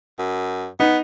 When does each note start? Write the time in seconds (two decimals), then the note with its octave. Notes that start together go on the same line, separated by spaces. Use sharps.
0.19 F#2
0.80 B3 D#4